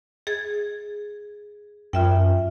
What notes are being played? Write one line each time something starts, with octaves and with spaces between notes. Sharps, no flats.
G#4 G#6 A6
F#2 F4 E5 G5